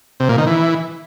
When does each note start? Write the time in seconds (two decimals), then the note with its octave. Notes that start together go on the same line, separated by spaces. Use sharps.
0.20 C3
0.29 A#2
0.38 D#3
0.47 E3